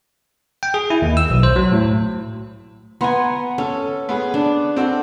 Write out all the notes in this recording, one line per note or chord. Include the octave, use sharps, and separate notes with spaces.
G5
G#4
E4
D#2
E6
B1
C5
F#3
A2
B3 F#5 G#5 A#5 C6
C#4 A4
B3 G#4
D4
C4 F#4 A4